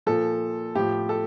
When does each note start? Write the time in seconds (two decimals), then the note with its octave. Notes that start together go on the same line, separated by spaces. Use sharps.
0.06 A#2 F3 A4
0.75 A2 F3 G4
1.09 A4